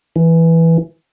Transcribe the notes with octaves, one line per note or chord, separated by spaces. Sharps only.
E3